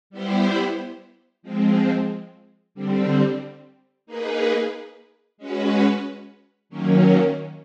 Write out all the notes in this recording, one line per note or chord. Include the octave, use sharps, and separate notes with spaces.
G3 B3 E4 G4 C5
F3 G#3 C4
D3 G3 C4
A#3 D#4 G#4 B4
G#3 C#4 F#4 B4
D#3 F#3 A#3 C#4